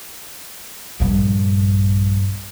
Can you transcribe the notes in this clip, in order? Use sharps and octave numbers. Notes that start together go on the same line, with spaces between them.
A#1 G2